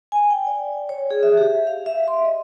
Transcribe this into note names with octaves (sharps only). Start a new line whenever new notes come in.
G#5
G5
D5
C#5
G#4
E5
G4
F5
E5
C6
D#5